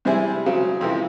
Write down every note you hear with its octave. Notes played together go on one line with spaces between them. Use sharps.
C3 G3 C4 E4 G#4
C#3 F#3 C4
F2 C3 E3